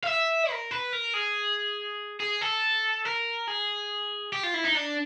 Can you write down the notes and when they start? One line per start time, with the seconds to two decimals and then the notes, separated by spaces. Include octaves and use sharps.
0.03 F5
0.07 E5
0.50 A#4
0.71 B4
0.93 A#4
1.14 G#4
2.20 G#4
2.42 A4
3.05 A#4
3.48 G#4
4.33 G4
4.43 F4
4.54 E4
4.65 D#4
4.75 D4